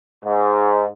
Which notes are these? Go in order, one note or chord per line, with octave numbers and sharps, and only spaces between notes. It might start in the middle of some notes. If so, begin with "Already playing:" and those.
G#2